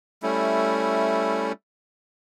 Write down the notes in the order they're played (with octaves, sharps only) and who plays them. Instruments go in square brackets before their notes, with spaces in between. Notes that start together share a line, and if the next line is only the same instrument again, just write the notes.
[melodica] G3 A3 C#4 E4